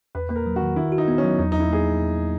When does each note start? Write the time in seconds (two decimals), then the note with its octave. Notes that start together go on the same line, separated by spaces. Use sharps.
0.15 E2 B4
0.29 A#3 B4
0.36 A#4
0.46 F#3
0.56 F#4
0.61 D#3
0.76 D#3 E4
0.92 F#4
0.98 D#4
1.08 B3
1.18 C#4
1.24 F#3
1.39 E2 D#4
1.52 E2 D#4
1.60 E4
1.69 A#3 G#4